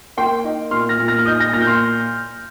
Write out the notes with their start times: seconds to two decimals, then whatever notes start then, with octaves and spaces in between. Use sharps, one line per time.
0.17 A#3 G5 C6
0.44 D#4
0.71 A#2 C6 F6
0.89 F6 A#6
0.99 A#2
1.08 F6 A#6
1.19 F6
1.26 D#4 D#6 G6
1.40 F6 A#6
1.53 A#2 F6 A#6
1.61 G6
1.67 C6 F6